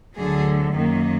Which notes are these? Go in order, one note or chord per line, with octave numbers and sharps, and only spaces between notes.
D2 D3 F#3 G#4
F#2 D#3 A#3